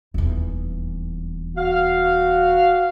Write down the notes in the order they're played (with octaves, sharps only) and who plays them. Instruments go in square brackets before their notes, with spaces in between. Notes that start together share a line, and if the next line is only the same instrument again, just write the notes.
[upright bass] D#1 E2
[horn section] F#4 F5